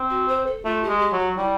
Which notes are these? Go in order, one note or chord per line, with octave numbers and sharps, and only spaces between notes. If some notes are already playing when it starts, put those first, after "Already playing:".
Already playing: C4
F#4
C5
A4
A3 F4
G4
G#3
G4
F#3
F#4
G3 E4